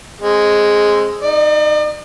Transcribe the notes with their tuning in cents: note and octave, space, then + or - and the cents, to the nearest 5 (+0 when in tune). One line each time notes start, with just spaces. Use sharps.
G#3 +0 C4 +25
D#4 +0 D5 +45